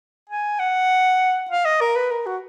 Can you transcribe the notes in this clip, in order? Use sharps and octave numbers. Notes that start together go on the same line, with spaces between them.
G#5
F#5
F5
D#5
A#4
B4
A#4
F#4